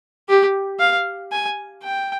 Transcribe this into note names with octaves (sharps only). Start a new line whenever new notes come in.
G4
F5
G#5
G5